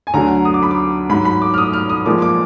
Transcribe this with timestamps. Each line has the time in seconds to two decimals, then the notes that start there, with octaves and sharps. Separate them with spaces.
0.07 G#5
0.14 D2 D3 F#3 A#5
0.45 D#6
0.54 D6
0.63 B5
0.71 D6
1.10 G#2 F#3 B5
1.25 B5
1.42 D6
1.54 F6
1.58 D#6
1.73 F6
1.90 D#6
2.06 A#2 F3 G#3 D6
2.22 D6